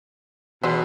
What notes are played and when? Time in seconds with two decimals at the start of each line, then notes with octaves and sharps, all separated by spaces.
0.63 B2 E3 F#3 G#3 D5 C6